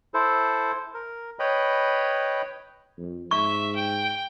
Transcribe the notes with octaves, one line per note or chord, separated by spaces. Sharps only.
E4 A4 C5
A#4
B4 C#5 D#5 G5 B5
F2
G#2 E5 C#6
G5